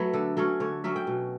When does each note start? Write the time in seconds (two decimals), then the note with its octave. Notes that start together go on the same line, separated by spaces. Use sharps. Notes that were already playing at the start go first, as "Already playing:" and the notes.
Already playing: F#3 A3 B4
0.13 D3 A4
0.37 F#3 C#4 A4
0.60 D3 C#5
0.84 F#3 C#4 E5
0.96 G5
1.07 B2